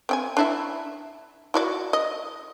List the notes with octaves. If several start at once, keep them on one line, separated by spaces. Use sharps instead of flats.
C4 G5 G#5
D4 E4 E5
E4 F#4 D5
D#5